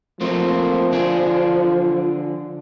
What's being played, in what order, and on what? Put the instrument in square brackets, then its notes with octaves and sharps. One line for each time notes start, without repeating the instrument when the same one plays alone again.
[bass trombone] F3 [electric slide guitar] A3 A#3 C4
[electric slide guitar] D3 D4 G#4